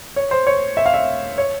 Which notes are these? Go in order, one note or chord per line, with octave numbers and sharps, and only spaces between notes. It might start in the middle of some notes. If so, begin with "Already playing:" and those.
C#5
C5
C#5
E5
F5
E5
C#5